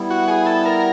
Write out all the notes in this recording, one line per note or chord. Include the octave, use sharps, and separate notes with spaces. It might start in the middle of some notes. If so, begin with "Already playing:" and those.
Already playing: G3 B3 E4
F#4
G#4
A4
A#4